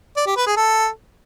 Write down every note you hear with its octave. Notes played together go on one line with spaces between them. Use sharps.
D5
G4
B4
G#4
A4